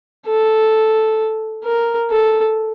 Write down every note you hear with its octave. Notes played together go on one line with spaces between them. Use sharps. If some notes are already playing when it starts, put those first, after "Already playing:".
A4
A#4
A4